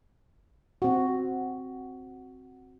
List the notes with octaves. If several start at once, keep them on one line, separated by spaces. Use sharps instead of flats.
C4 F#4